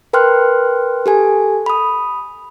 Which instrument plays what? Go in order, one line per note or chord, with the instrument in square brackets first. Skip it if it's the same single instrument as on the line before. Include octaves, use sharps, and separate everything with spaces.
[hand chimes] A#4 B4 G5 C6 F6 F#6
G4 A4 G#5
B5 D#6